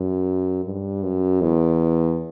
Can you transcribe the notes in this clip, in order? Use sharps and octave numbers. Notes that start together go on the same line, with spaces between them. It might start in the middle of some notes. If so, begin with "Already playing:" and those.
Already playing: F#2
G2
F#2
E2